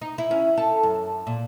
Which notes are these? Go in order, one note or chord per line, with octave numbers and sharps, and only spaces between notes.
D#4
E4
C#4
A4
F#2
A#2